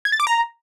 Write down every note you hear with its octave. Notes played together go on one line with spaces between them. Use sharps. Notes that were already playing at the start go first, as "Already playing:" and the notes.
G#6
A6
D6
A#5